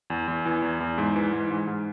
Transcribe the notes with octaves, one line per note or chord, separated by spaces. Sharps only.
E2
E2
E3
E2
E2
G#2
E3
G#2
G#2
G#2